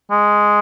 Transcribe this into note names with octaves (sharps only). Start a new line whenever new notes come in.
G#3